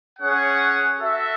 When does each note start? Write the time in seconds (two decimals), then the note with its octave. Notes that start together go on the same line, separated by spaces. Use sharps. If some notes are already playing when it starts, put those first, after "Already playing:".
0.19 C#4 G#4 C#5 F#5
0.98 F#4 A4 E5